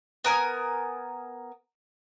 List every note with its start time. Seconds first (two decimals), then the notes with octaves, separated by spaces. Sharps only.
0.24 B3 A#4 G#5 D#6